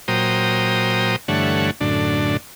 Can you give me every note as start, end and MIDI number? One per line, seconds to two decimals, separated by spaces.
0.08 1.16 46
0.08 1.16 54
0.08 1.16 72
0.08 1.16 79
0.08 1.16 82
0.08 1.16 87
1.28 1.71 43
1.28 1.71 50
1.28 1.71 52
1.28 1.71 57
1.28 1.71 73
1.28 1.71 78
1.81 2.37 42
1.81 2.37 45
1.81 2.37 50
1.81 2.37 62